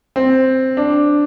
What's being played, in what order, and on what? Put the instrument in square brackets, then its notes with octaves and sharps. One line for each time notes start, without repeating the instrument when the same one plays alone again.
[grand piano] C4
D4